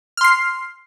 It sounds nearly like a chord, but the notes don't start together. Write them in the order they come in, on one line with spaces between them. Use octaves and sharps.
F6 C6 C7